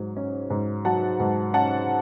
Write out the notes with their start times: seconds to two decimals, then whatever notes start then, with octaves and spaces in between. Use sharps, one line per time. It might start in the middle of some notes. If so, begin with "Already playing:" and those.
Already playing: G#2 F#3
0.17 C#4
0.50 G#2
0.85 F#3 F#5 A5
1.20 G#2
1.54 C#4 F#5 A5